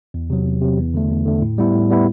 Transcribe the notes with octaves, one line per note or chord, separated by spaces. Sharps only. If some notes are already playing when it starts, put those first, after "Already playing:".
E2
C3 F#3
E2
C3 F#3
E2
D3 A3
E2
D3 A3
A2
G3 B3 E4
A2
G3 B3 E4